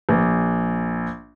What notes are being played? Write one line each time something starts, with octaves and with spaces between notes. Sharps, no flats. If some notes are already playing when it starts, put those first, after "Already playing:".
A#1